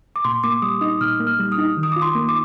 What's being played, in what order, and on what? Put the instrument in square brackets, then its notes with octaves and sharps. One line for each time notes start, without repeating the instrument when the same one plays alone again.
[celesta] D6
[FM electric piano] A#2 [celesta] C6
[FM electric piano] A#3 [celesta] D6
[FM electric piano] G3 [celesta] D#6
[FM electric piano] D#4 [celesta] D#6
[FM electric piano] A#2 [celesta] F6
[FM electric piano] A#3
[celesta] F6
[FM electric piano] G3
[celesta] D#6
[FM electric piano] D#4
D#3
[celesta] D#6
[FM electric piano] F4 [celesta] D6
[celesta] C6
[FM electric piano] A#3
[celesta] D6